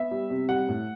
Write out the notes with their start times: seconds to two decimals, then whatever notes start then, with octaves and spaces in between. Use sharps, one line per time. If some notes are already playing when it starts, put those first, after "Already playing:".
Already playing: B3 E5
0.11 G3
0.30 C3
0.49 G3 F#5
0.69 A2